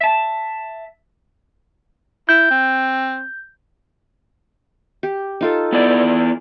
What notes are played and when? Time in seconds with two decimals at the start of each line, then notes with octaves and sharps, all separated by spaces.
0.01 E5 A5
2.29 E4 G6
2.51 C4
5.03 G4
5.41 D#4 F4 A4
5.72 B3 E4 D5